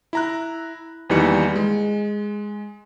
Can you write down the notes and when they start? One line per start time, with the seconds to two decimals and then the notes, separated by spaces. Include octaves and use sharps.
0.13 E4 A#5 F#6
1.10 E2 D#3 E3 G3 A#3 C#7
1.56 G#3